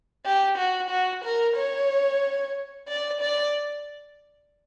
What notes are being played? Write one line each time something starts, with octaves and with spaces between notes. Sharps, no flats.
G4
F#4
F#4
A#4
C#5
D5
D5